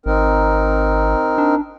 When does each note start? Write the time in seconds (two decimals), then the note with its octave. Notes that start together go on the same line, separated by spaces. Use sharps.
0.06 G#1 C4 D#4 A#4
1.38 D4